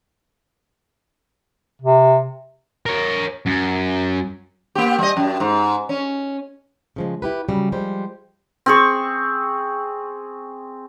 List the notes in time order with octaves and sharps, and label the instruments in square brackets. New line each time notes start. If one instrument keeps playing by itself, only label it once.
[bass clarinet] C3
[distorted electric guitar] A#4 C#5
F#2
[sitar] A#3 G4
G3 D#5
F#2
G#2
C#4
[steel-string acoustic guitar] C#3 F3 G#3
E4 G4 B4
C#3 F#3 G3
F3 G3 G#3 C5
[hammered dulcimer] C4 G#4 C#6